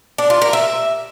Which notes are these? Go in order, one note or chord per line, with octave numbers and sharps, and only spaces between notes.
D4
F4
A#4
E5